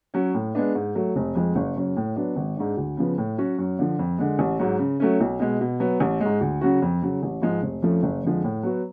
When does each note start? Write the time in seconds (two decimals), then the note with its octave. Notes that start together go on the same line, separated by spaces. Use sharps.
0.14 F#3 C#4
0.34 A2
0.55 G#3 B3 D4
0.75 G#2
0.95 F#3 A3
1.16 F1
1.35 F2 F3 G#3
1.56 F#1
1.76 F#2 C#3
1.96 A2
2.16 F#3 B3 D4
2.36 G#1
2.57 G#2 G#3 D4
2.77 D2
2.97 C#3 F3 B3
3.18 A2
3.38 F#3 C#4 F#4
3.59 F#2
3.79 D3 F3
3.99 F2
4.18 D3 G#3
4.39 A1
4.59 G#2 F#3
4.79 C#3
5.00 F#3 A3 C#4
5.20 B1
5.40 B2 G#3
5.61 B2
5.80 F#3 B3
6.00 A1
6.21 G#3
6.26 G#2
6.41 D2
6.61 C#3 F#3 C#4 F#4
6.82 F2
7.02 C#3 F#3
7.23 A1
7.42 G#2 F3 G#3
7.63 F1
7.82 F2 F3 A3 C#4
8.03 F#1
8.23 F2 D3 F3 G#3
8.44 A2
8.63 F#3 B3 F#4